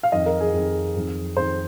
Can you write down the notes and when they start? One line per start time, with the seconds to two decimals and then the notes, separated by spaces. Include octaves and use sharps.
0.03 F5
0.12 F2 D#3 D#5
0.26 A#4
0.40 G#4
0.54 F2 D#3
0.96 F2 D#3
1.37 F2 D#3 C5